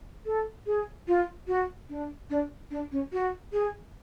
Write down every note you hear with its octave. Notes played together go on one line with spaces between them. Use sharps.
A4
G#4
F4
F#4
D4
D4
D4
C#4
F#4
G#4